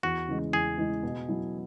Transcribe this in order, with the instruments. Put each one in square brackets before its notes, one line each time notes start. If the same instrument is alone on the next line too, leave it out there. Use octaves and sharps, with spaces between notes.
[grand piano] E2 [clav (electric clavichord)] F#4
[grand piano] C#3 E3 G#3
[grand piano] E2 [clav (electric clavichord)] G#4
[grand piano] C#3 E3 G#3
B2
F#3 E4